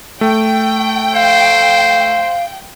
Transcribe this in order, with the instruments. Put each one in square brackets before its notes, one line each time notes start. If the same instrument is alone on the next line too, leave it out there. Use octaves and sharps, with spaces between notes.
[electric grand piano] A3 [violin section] G5
[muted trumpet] C5 [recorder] F5